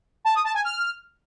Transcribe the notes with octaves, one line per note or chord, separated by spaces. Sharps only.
A5
D#6
A5
G#5
F6